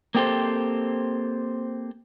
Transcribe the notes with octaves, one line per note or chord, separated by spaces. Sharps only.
A#3 C4 G4 A4 C5